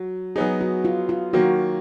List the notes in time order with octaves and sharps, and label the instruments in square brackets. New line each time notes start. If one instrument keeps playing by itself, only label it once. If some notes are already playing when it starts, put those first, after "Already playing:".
Already playing: [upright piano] F#3 [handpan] F#4
[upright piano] F#3 B3 D#4 [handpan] G#4
[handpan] F#4
F4
F4
[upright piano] D#3 F#3 A#3 [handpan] F#4